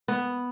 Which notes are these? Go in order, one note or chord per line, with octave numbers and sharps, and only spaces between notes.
B3